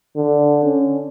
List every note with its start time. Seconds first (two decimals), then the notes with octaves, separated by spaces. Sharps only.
0.17 D3
0.65 C#4